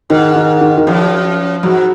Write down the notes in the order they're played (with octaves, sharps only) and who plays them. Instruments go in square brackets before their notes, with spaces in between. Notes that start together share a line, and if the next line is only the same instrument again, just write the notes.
[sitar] G#2 [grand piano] D#3
[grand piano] D#3
D#3
D#3
[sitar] F#2 [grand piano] F3
[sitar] G#2 [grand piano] F#3